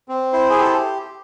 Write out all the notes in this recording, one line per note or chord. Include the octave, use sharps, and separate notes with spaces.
C4
E4 C5
G#4
G4 A4